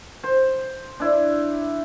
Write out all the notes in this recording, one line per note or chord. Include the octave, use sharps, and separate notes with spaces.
C5
D4 E4